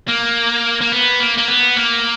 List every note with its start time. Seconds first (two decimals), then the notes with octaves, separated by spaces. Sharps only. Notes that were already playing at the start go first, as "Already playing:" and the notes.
0.08 A#3
0.81 A#3
0.92 B3
1.20 A#3
1.38 A#3
1.48 B3
1.77 A#3